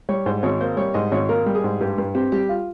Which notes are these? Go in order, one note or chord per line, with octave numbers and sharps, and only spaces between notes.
G3 C#5
G#2 C5
G#1 C#5
A#3 C5
G3 C#5
G#2 D#5
G#1 C#5
A#3 A#4
G3
G#4
G#2
G2 G4
G2
C4 G4
G3 G4
F4